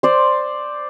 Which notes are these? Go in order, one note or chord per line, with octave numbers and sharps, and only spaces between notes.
C5 D5